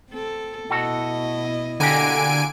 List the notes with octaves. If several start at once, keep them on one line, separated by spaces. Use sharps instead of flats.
C4 A4
B2 E4 F#4 A4 D#5
D3 A#3 F#4 G4 G#5 D7